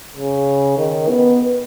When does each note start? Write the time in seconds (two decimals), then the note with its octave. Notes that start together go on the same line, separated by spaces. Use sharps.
0.17 C#3
0.78 D#3
1.09 B3